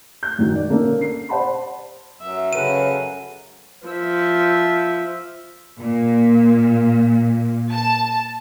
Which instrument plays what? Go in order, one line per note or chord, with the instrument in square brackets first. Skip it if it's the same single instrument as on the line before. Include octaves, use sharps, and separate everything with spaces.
[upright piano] G6
F#2 D#3 F#3
D5
D3 A#3 C#4 A4 A#4
C7
C5 D5 F#5 A5 B5 C6
[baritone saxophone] F#2 [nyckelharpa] E5
[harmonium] C#3 C#4 B4 [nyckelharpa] A4 F#5 [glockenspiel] D#7
[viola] F3 E5
[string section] A#2
A5